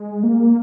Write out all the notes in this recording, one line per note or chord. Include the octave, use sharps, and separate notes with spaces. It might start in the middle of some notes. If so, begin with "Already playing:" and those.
Already playing: G#3
A#3